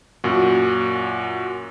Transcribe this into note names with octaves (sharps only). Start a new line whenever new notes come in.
F#2 A#2 F#4